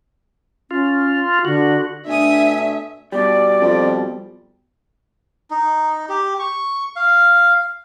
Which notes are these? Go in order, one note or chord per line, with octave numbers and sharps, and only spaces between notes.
C#4 F4
D3 F#4
B2 A3 D4 E5 G#5 D#6
B2 G3 D5
F2
D#4
G4
C#6
F5